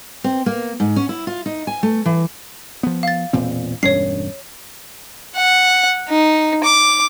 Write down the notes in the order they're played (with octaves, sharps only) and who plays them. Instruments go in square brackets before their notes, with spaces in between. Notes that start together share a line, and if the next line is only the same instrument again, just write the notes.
[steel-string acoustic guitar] C4
A#3
G#2
C#4
E4
F4
D#4
G#5
A3
E3
[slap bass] F3 B3
[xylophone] F5 A6
[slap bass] E1 A#2 C4
[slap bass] E1 G2 C#4 [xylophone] C#5 C7
[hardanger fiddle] F#5
D#4
D6